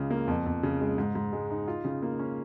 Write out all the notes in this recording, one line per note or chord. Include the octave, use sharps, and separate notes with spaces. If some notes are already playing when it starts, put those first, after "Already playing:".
Already playing: C#2 C#3 F4
A#3
F2
F2
C#3
G#3
G#2
G#2
G#3
D#4
F4
C#3
A#3
C#4